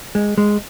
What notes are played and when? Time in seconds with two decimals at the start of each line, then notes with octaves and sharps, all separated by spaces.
0.15 G#3
0.38 G#3